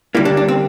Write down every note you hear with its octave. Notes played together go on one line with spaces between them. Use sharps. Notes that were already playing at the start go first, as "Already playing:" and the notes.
D3 G3 A#3 E4
D4
D4
C4